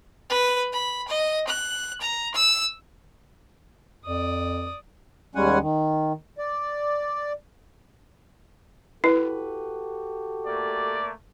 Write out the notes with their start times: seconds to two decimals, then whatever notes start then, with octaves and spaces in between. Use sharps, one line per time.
0.30 B4
0.73 B5
1.09 D#5
1.48 F#6
2.01 A#5
2.35 E6
4.05 F2 D5 D#6
5.35 D#2 G3 G#3 C#4 F#5 G#5
5.61 D#3
6.38 D5
9.04 E4 F#4 G4 A4 B4
10.46 A3 A#3 D5